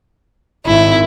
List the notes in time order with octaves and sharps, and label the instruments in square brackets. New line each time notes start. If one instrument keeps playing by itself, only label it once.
[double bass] G#1 [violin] E4